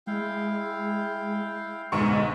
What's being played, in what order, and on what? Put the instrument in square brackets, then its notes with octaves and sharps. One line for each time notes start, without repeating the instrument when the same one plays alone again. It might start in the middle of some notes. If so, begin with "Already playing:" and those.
[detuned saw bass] G#3 [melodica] E4 F5 G5
[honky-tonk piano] B1 G#2 C#6 [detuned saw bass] D3 [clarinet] G#3